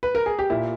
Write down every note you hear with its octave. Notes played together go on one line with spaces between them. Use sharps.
B4
A#4
G#4
G4
A#2 E4